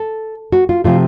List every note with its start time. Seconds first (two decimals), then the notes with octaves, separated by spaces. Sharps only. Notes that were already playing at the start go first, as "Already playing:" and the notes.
Already playing: A4
0.52 F#4
0.69 F4
0.84 C3 F3 A3 F4